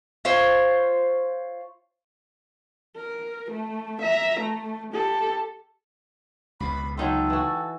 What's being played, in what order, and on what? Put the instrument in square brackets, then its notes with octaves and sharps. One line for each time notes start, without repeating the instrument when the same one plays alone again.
[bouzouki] F4 C5 C#5
[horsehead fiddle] A#4
A3
E5 A#5
A3
G4 A4
[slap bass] C#2 B2 [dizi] B5
[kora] F#3 D#4 F4 [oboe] A4 [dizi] G5
[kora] E3 F#4